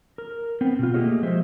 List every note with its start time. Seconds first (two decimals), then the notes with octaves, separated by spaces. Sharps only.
0.18 A#4
0.61 B3 C4
0.79 B2 F4
0.94 A3 A#3 G4 G#4 C#5 D#5
1.23 F3 G#3 C5 E5